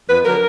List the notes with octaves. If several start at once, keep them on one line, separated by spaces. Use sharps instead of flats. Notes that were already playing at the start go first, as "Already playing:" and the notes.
F2 B4
D3 F#3 A#4